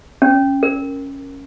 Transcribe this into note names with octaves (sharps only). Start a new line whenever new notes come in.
C#4
A#4